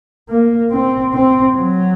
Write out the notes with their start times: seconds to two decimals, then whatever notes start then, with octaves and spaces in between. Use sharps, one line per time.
0.29 A#3
0.71 C4
1.13 C4
1.55 F#3